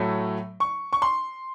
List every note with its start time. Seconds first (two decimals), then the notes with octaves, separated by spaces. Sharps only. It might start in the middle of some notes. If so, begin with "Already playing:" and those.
Already playing: A2 F#3 A3
0.60 C#6
0.93 C#6
1.02 C6